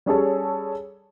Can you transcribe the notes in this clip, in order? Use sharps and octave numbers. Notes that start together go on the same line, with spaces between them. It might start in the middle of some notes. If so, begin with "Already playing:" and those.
G3 C#4 G#4 A4 C#5